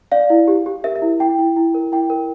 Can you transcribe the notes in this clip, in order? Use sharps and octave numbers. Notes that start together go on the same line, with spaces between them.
D5 F5
E4
G4
G4
A#4 E5
E5
E4
E4 G5
E4
E4
A#4
E4 G5
A#4